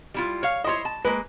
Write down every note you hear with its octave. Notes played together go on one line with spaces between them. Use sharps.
G3 E4 F4
C#5 F5
E4 C5 C#5 D#5 C6
A5
G#3 A#3 B4